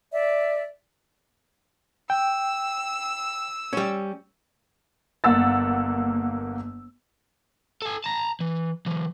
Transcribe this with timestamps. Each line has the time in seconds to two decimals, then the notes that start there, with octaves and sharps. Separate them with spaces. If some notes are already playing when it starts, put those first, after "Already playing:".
0.12 D5 E5
2.10 G5 E6
3.73 G3 C#4
5.24 G1 A#3 F#5 E6 A6
7.82 A4 G#5
8.04 A5 A#5
8.40 E3
8.86 E3 F#3